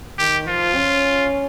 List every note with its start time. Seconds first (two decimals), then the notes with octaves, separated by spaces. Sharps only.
0.18 D#3 G4
0.48 F3 F4
0.76 C#4